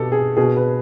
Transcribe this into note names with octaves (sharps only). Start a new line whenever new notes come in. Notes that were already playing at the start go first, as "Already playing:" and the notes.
Already playing: B2 G4 A4
G#4
B2 G#4
B4